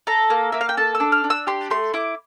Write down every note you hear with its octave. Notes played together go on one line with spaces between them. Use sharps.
A4 A#5
A#3
A#3 E5
F5
G5
A4 A5
E6
D4
F6
D4
E6
G4 C6
A3 C6
E4 D6